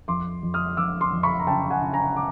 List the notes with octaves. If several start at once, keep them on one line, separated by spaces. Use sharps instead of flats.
F2 C6 D6
F2
D#6 F6
F2 D6 E6
C6 D6
F2
B5 C#6
A#5
C#3 G5 A5
F#5 G#5
C#3
G#5 A#5
D6